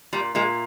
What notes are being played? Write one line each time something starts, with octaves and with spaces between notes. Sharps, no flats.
A#2 G3
A#2 G#3